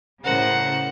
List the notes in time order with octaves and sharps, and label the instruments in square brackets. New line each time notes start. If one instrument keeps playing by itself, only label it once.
[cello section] A2 C#3 A#4 [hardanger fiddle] C5 F#5